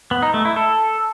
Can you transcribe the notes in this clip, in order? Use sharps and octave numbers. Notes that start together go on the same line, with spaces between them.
B3
D#4
A3
E4
A4